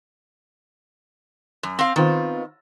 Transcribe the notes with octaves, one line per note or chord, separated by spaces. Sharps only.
F#2
C4 F5
D#3 B3 C4 F4